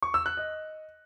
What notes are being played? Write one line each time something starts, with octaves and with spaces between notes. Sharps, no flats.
C#6
E6
F#6
D#5